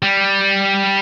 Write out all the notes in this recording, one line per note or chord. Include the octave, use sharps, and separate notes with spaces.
G3